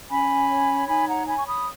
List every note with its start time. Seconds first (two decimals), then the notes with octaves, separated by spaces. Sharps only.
0.09 C#4 G#5 B5
0.49 C#5
0.87 D#4 G#5 B5
1.06 F#5 A#5
1.26 C#5 G#5 B5
1.38 C#6
1.46 B5 D#6